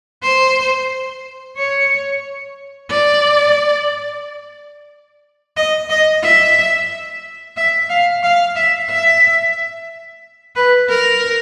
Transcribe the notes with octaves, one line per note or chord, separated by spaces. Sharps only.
C5
C#5
D5
D#5
D#5
E5
E5
F5
F5
E5
E5
B4
A#4